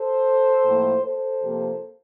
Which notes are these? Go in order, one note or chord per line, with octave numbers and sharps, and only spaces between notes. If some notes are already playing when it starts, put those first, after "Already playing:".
Already playing: A4 C5
A2 F3 A#3
A4 C5
C3 F3 A#3